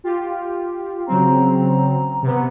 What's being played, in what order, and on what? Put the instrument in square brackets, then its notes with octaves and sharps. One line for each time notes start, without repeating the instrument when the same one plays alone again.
[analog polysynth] F4 G4
[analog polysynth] C#3 F#3 C4 [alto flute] A#5
[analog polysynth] C3 B3